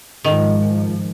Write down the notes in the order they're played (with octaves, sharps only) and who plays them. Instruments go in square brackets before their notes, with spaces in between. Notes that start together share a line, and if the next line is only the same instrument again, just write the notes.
[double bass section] G#2 F3 [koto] D#3